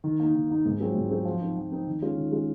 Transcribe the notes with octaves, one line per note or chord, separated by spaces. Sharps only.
D#3
A#3 D#4
D#3
A#3 D#4
G#2
F#3 C4 F4 G#4
G#2
F#3 C4 F4 G#4
F3
C4 D#4
F3
C4 D#4
D#3
G#3 C#4 F4
D#3
G#3 C#4 F4